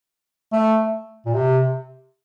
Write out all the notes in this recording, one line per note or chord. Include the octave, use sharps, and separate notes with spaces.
A3
A#2
C3